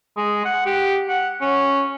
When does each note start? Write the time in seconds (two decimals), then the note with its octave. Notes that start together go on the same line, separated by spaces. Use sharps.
0.17 G#3
0.45 F#5
0.66 G4
1.09 F#5
1.41 C#4